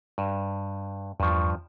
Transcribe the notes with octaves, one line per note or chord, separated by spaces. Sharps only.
G2
E2 G2 F3 C#6